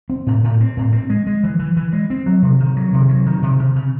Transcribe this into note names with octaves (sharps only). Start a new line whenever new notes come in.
C4
A2
A2
C4
A2
C4
G#3
G#3
E3
E3
E3
G#3
C4
F#3
C3
D#3
F#3
C3
F#3
D#3
C3
C#3
C#3